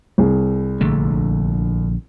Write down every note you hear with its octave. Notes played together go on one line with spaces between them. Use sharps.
C2 G#4
A#1 D3 A3